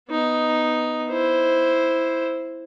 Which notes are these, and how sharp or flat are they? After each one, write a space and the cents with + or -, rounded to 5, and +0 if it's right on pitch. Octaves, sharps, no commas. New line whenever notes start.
B3 +0 D#4 +0
E4 +0 C5 +0